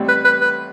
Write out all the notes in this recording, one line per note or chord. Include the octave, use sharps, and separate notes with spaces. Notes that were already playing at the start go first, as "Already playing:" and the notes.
Already playing: A1 A2 G3 C4
B4
B4
B4